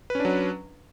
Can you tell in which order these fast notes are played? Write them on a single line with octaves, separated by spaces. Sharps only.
B4 C#4 D4 F#3